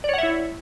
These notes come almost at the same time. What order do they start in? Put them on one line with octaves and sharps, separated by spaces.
D5 C#5 F#5 E5 E4